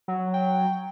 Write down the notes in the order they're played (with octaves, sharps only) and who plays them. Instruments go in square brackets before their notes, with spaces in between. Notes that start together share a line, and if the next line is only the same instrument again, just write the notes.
[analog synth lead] F#3
[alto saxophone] G5